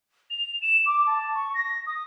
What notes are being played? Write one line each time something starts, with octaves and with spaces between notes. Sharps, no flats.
F7
E7
D6
A5
C#6
A#6
D#6